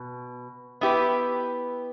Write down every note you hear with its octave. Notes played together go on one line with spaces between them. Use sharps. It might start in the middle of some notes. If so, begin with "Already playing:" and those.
Already playing: B2
B3 E4 G4 B4